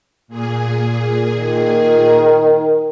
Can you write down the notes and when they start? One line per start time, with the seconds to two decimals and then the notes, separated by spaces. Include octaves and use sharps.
0.28 A#2 G#4
1.37 D#3